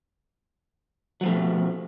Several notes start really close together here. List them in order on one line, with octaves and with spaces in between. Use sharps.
F#3 F3 A3 B2